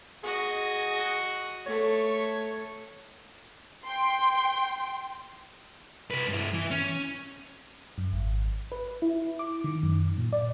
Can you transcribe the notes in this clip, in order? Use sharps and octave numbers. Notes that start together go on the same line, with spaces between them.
F#4 G#4 D#5
A3 A4 C#5
G5 C6
C2 B4
G2 E4
E3
C#4
F#2
G#1
B4
E4
D6
D#3
F#2
A#2
D5